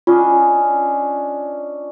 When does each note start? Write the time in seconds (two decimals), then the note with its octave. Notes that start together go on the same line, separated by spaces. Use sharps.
0.07 C#4 D4 F4 D#5